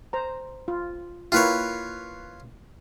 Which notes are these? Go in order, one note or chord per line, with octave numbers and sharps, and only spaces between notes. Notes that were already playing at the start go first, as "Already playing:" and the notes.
C5 A#5
F4
A#3 E4 F4 B4 C#5 G5